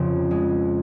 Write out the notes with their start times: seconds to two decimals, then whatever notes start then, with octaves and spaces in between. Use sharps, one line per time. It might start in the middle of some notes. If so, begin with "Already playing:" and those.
Already playing: F2 C#3
0.31 G#3